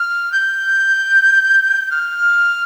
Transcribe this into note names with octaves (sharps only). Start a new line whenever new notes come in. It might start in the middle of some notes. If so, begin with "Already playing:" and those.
Already playing: F6
G6
F6